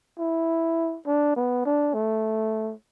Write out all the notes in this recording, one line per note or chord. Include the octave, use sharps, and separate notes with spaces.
E4
D4
B3
D4
A3